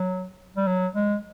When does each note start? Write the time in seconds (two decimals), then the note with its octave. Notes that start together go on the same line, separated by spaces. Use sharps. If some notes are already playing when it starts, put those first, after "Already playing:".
Already playing: F#3
0.57 G3
0.67 F#3
0.95 G#3